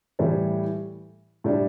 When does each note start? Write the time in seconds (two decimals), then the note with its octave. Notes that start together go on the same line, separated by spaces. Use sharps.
0.19 A2 E3 G3
1.44 A2 G3 D4